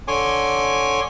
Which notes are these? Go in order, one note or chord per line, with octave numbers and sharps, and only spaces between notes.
D3 C#5 G#5 C6 D6